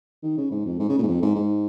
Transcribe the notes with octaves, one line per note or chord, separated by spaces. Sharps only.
D#3
C#3
G#2
F2
G#2
C#3
A#2
G#2
F2
G#2
G#2